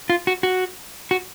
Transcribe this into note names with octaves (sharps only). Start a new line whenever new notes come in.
F4
F#4
F#4
F#4